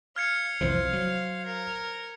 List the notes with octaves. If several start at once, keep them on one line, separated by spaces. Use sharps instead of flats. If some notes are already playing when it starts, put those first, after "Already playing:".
F5 F6 G#6 C#7
C2 F2 E3 C5
F#3
A#4